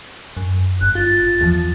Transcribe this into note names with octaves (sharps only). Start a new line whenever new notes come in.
F#2
G1 F#6
F4 A6
E2 F3